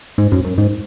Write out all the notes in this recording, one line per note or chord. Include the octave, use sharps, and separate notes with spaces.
G#2
F#2
F#2
G#2